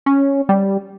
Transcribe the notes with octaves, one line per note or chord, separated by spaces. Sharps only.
C#4
G3